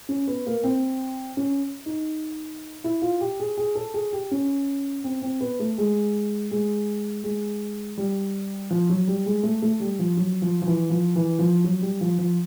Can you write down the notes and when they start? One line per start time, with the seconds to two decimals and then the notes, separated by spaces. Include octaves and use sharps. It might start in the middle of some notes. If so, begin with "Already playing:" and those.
0.09 C#4
0.28 B3
0.47 A#3
0.64 C4
1.37 C#4
1.86 D#4
2.84 E4
3.02 F4
3.21 G4
3.40 G#4
3.57 G#4
3.75 A4
3.94 G#4
4.13 G4
4.31 C#4
5.04 C4
5.22 C4
5.41 B3
5.60 A3
5.78 G#3
6.51 G#3
7.24 G#3
7.98 G3
8.70 F3
8.90 F#3
9.07 G3
9.26 G#3
9.43 A3
9.62 A3
9.80 G3
9.99 F3
10.17 F#3
10.42 F3
10.62 F3
10.67 E3
10.90 F3
11.16 E3
11.39 F3
11.64 F#3
11.82 G3
12.01 F3
12.19 F3